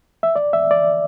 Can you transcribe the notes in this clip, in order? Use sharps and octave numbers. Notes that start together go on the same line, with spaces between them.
E5
D5
E5
D5